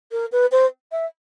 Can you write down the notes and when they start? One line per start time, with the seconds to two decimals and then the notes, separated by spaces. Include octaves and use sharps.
0.11 A#4
0.32 B4
0.51 C5
0.91 E5